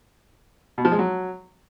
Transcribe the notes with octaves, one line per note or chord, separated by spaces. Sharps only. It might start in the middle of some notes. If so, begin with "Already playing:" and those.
B2
F3
G#3
F#3